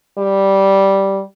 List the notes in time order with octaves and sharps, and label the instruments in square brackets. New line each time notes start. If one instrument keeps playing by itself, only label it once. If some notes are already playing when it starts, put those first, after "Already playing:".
[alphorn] G3